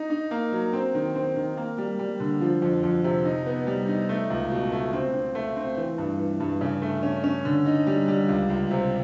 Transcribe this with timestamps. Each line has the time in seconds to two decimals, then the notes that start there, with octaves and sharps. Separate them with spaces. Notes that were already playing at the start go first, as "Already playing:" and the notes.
Already playing: D#4
0.10 D#4
0.31 A#3
0.52 F#3
0.73 C4
0.95 D#3
1.15 C4
1.36 D#3
1.57 A#3
1.78 G3
1.99 G3
2.20 D3
2.41 F3
2.62 F2
2.83 F2
3.04 C3
3.25 D#4
3.46 B3
3.67 G3
3.88 D#4
4.09 A3
4.30 C#2
4.51 B2
4.72 A3
4.93 C4
5.14 C4
5.35 A3
5.56 C4
5.77 E3
5.98 G2
6.19 E3
6.40 G2
6.61 C#3
6.82 A3
7.03 C#4
7.24 C#4
7.45 D3
7.66 D#4
7.87 G3
8.08 G3
8.29 C#2
8.50 C#2
8.71 C3